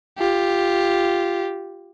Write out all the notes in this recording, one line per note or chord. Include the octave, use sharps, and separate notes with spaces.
F4 G4